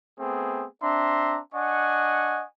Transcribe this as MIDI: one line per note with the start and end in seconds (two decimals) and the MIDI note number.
0.19 0.67 57
0.19 0.67 59
0.19 0.67 60
0.19 0.67 68
0.83 1.41 60
0.83 1.41 62
0.83 1.41 76
0.83 1.41 82
0.83 1.41 84
1.54 2.45 62
1.54 2.45 75
1.54 2.45 78
1.54 2.45 80
1.54 2.45 85